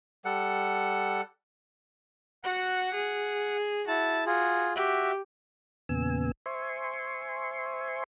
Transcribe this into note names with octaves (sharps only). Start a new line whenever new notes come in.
G3 A4 F#5
F#4 F#5
G#4
E4 F#4 A5
F4 F#4 G#4
F#4 G4 E5
E2 A#2 C#3 B3 G#5 E6
C5 E5 G#5 C6 C#6